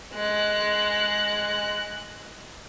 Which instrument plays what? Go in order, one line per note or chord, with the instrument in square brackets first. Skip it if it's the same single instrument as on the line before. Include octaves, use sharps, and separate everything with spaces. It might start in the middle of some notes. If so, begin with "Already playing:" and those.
[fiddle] G#3 F#6